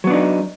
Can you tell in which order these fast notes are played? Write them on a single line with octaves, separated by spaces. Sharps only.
F#3 B3 D4 D#4